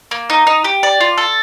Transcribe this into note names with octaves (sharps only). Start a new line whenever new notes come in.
A#3
D#4
D#4
G4
D5
F4
A4